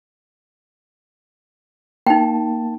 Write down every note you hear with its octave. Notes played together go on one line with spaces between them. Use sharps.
A#3 D#4 G5 A5